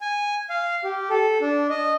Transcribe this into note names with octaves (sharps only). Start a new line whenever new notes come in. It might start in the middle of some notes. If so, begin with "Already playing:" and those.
G#5
F5
G4
A4
D4
D#5